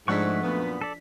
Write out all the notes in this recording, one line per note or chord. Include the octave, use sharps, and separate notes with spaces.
G#2 F3 A3 D4 F#5 C#6 B6
F#2 A#2 B3
A4 D5